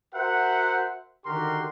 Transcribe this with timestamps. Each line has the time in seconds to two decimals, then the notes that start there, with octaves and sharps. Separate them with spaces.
0.13 F#4 A#4 C5 E5 F#5
1.26 D3 D#3 F#4 G4 A#4 C6